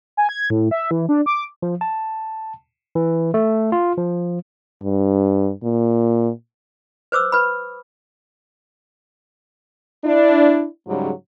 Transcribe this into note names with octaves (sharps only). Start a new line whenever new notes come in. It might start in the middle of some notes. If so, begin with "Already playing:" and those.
G#5
G#6
A2
E5
E3
D4
D6
F3
A5
E3
A3
F4
F3
G2
A#2
B4 C5 D6 E6
B4 B5
D4 E4
G#2 C#3 F#3 G3